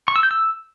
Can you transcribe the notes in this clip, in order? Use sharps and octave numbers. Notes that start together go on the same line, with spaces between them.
C#6
E6
G6
E6